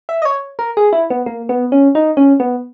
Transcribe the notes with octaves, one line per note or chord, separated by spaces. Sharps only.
E5
D#5
C#5
A#4
G#4
E4
B3
A#3
B3
C#4
D#4
C#4
B3